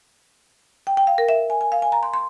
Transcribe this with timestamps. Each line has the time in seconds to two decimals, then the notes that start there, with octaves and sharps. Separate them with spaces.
0.87 G5
0.97 G5
1.07 F5
1.18 A#4
1.29 E5
1.50 G#5
1.61 G#5
1.72 F5
1.82 G#5
1.92 A#5
2.03 C6
2.14 C6